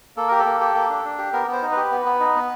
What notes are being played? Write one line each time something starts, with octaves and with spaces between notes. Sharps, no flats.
A#3 A4
G4 A#4
A4
A#3
G4
A#3
D4
D4
G4
B3 A#4
B3 C5
D#4
B4
G4
B3
B3
D#4
B3